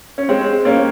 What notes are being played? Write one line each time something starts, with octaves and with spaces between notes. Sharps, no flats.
C#4
G#3 C4
A#3 C#4